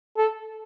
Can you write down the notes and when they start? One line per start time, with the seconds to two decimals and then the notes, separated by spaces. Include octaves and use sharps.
0.17 A4